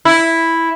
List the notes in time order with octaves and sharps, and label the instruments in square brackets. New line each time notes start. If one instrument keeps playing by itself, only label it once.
[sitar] E4